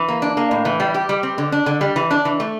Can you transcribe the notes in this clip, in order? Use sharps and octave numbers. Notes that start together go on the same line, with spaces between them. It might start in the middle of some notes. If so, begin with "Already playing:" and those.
Already playing: E3
A#3
D4
A#3
A2
E3
G3
G4
G3
C4
D3
D4
D3
G3
E3
D4
E3
A3